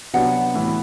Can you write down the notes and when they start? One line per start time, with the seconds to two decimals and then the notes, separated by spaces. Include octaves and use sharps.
0.13 C3 F#3 B3 D4 F#5
0.54 A2 E3 B3 E4